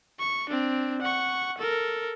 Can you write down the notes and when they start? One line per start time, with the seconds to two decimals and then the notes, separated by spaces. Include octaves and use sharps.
0.19 C#6
0.49 C4 D4
1.01 F#5 C#6
1.58 A4 A#4